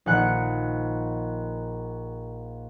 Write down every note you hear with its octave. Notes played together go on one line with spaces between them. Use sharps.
A#1 D#3 F#5 F#6